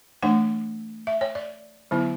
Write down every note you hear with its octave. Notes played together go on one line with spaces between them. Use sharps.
E3 A3 D4 F#5
E5
C#5
D5
D3 F#3 B3 E4